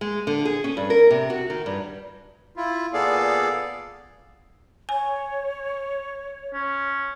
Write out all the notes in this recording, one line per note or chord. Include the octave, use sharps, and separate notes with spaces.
G#3
D3
G#4
C#4
G2
A#4
C3
F#4
D#3
G2
E4 F4
A#2 B3 G#4 A4 D5 F5
C#5 G#5
C#4